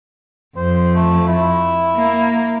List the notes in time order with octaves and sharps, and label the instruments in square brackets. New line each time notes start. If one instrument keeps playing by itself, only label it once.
[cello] F2 [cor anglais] C5
[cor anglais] A3
E4
[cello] A#3